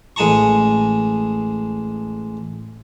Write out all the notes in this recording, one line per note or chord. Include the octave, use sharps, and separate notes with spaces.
A1 G#3 D#5 A5 A#5 C#6